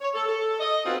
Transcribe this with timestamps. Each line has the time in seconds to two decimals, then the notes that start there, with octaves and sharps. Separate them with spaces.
0.01 C#5
0.15 A4
0.27 A4
0.60 D#5
0.85 B3 C4 D#4 F4 F#4